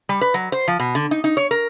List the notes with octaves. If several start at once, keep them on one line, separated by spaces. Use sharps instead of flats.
G3
B4
F#3
C5
F3
B2
D3
D#4
D#4
C#5
A#4